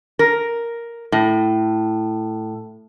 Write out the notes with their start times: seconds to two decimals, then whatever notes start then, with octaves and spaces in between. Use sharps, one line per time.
0.19 A#4
1.12 A2